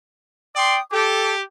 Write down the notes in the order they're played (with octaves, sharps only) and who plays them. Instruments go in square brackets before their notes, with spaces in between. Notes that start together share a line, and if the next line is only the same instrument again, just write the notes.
[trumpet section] D5 C6 [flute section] G5 D#6
[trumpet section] G4 [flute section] A4 A5 D6